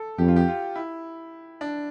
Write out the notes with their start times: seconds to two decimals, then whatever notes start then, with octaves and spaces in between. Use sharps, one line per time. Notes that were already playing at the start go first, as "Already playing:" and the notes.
Already playing: A4
0.18 F2 G4
0.28 F4
0.36 G4
0.48 F4
0.75 E4
1.61 D4